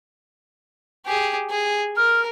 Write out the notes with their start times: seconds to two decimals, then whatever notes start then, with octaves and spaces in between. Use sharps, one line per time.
1.06 G4 G#4
1.50 G#4
1.97 A#4 F6